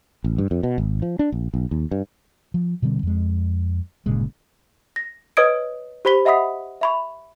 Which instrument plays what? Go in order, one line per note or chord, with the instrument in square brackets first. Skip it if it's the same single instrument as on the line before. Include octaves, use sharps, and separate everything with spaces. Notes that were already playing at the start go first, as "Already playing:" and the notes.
[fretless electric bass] A1
G2
F2
B2
G#1
F3
D4
A#1
B1
D#2
G2
F3
B2 D3 G3 C4
F2 G#3
G1 A#2 C#3 G#3
[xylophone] A#6
B4 C#5 D#5 D#6 G#6 D7
G4 C5 B5 B6 G7
D#5 E5 F#5 B5 D#6 B6
E5 B5 C#6